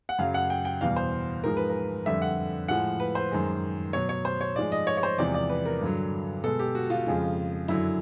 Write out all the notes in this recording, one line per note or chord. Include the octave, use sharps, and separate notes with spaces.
F#5
F#2 C#3 F#3 F5
F#5
G5
G5
E2 B2 G3 F5
C5
G#2 F3 G#3 A#4
B4
A#4
F2 D3 G3 E5
F#5
A2 F3 G#3 F#5
B4
C5
F#2 D#3 G#3
B2 F#3 C#5
C#5
C5
C#5
G#2 F3 G#3 D5
D#5
C#5
C#5
C5
E2 C3 F3 G#3 D5
D5
B4
A#4
G2 D3 F#3
B2 G#3 A4
G4
F#4
F4
F2 C#3 F3 G#3
F#2 D3 F#3 E4